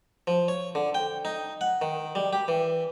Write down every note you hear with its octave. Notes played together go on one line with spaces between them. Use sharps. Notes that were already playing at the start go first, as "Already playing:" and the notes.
F3
C#5
D3
G5
D#4
F#5
D#3
G3
G4
E3